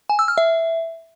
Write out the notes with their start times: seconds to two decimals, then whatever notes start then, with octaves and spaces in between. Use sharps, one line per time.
0.10 G#5
0.19 E6
0.28 F6
0.38 E5